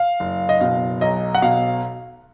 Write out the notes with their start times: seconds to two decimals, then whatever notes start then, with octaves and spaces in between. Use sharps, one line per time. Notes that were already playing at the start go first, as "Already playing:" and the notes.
Already playing: F5
0.20 F#1
0.49 D#5
0.61 B2 F5
1.01 B1 D#5
1.35 F#5
1.42 B2 F5